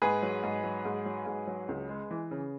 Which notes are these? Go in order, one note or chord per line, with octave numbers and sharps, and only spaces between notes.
G#2 G#4 B4
F#3
G#2
F#3
G#2
F#3
G#2
F#3
C#2
G#3
E3
C#3